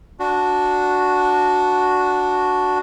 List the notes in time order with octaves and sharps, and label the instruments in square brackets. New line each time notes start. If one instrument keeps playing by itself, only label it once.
[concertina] D4 F#4